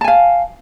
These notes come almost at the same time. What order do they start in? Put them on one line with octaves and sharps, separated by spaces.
A5 G#5 F5